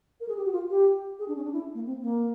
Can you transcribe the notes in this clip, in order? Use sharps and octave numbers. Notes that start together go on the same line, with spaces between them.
A#4
G#4
G4
F#4
F4
G4
G#4
D4
C#4
D4
E4
A#3
C4
A#3